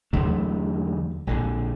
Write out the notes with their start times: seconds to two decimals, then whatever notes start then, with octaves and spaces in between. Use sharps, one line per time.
0.13 E2 D3 F#3 A3
1.27 A#1 D3